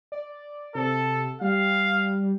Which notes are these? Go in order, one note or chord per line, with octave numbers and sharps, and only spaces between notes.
D5
C3 A4
G3 F5